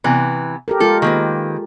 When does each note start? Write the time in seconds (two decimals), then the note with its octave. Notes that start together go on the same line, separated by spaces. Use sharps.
0.04 C3 E3 B3
0.68 G4 A4 A#4
0.80 G#3 F4 A4 A#4
1.02 D#3 A#3 B4